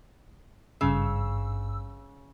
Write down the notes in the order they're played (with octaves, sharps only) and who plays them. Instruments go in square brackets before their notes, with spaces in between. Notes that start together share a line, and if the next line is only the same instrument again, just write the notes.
[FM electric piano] G#1 G2 E6 [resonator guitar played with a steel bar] C#3